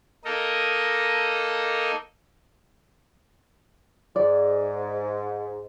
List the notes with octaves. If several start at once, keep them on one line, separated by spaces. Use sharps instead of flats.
A#3 D#4 A4 A#4 D#5
G#2 D5